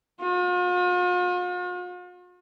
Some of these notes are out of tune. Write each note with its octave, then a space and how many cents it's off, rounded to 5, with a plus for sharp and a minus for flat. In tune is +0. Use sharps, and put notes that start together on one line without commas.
F4 +45